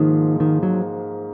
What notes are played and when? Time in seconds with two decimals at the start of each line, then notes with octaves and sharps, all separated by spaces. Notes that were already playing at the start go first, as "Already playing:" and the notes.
Already playing: G#2 D#3 F3 A#3
0.40 D#3
0.63 F#3